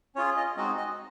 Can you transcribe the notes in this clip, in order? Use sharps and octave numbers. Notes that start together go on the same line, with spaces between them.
C#4 F4 G#4 C#5
D#5
G#3 C4 D#4 F#4 D#5
D#5